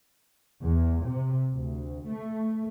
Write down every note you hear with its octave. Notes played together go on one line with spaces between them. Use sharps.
E2
C3
D2
A3